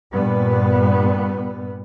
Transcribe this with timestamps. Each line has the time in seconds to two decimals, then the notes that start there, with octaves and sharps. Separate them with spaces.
0.13 G2 A#2 B3